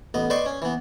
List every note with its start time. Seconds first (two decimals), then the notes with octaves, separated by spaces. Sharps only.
0.14 A1 B3 D#5
0.30 B4 C5 D5 D#5 C6 C#6
0.46 C#4
0.62 E3 B3